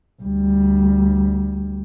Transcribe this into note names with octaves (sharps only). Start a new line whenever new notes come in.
D2 G3